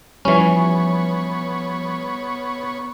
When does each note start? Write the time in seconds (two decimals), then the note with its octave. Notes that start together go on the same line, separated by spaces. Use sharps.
0.25 E3 F3 G3 B3 C#4 C#5